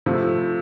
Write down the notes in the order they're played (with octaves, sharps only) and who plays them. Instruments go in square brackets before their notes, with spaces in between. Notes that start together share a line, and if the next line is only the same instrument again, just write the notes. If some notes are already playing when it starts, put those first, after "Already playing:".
[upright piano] C3 F3 A3